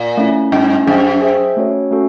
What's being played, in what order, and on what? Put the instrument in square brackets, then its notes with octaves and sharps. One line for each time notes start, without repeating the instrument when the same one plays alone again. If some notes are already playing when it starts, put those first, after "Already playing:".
Already playing: [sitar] A#2
[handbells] A3 C#4 E4
[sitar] G2 [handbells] A3 C#4 E4
[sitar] F#2 [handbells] G#4 C5 E5 G5
[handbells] G#4 C5 E5 G5
A3 C#4 F#4 A4 C#5
A3 C#4 F#4 A4